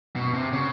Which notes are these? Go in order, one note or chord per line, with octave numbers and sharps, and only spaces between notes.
B2
C3
C#3